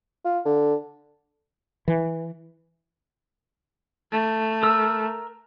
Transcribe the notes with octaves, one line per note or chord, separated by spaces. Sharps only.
F4
D3
E3
A3
A#4 E6